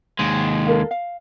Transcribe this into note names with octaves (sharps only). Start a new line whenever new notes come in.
D#2 G#3
A4 A#4 F5
F5